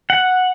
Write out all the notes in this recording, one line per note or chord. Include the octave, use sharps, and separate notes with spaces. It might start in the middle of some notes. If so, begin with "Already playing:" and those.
F#5